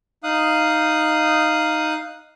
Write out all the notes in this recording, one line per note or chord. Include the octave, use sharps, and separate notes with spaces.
D#4 F5 D#6 F#6